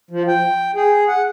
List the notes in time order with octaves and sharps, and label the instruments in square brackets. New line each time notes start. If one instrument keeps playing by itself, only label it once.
[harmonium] F3
G5
G#4
F#5